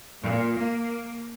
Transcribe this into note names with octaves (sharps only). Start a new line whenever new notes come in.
A#2
A#3